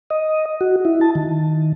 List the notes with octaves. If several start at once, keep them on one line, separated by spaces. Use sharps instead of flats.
D#5
F#4
E4
A5
D#3